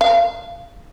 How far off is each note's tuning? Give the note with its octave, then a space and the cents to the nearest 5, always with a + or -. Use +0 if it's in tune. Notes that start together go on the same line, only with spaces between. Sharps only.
F5 -20